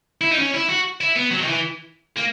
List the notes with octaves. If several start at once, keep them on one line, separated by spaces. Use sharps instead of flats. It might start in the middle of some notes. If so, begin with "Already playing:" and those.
E4
D#4
C#4
E4
F#4
E4
B3
F#3
D#3
E3
A#3